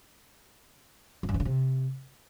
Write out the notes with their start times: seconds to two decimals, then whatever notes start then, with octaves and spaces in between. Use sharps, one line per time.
1.23 F2
1.29 F#2
1.34 E3
1.40 C#3
1.45 C3